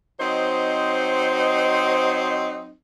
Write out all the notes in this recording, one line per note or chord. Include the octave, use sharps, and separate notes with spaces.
F#3 C4 D#4 C5 D#5